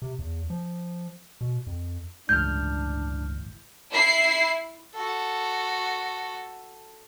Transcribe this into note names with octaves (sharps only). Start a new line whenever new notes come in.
C3
E2
F3
B2
F2
G1 C#2 A2 E3 D4 F6 G6
E4 C7
F#4 A4